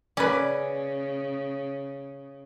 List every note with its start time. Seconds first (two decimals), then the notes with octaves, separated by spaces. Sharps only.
0.17 C#3 C#4 B4 D5